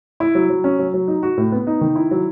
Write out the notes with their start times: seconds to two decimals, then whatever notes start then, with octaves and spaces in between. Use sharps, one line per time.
0.20 E4
0.35 F#3
0.50 F#3
0.64 C#4
0.79 F#3
0.94 F#3
1.08 D#4
1.23 F#4
1.37 A2
1.52 B3
1.67 D#4
1.81 D#3
1.96 E4
2.11 F#3